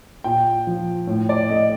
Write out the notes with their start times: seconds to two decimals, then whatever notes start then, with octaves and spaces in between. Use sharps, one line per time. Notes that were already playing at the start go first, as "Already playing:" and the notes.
0.24 A#2 G5
0.67 F3
1.07 A2
1.29 D5
1.50 A3 D#5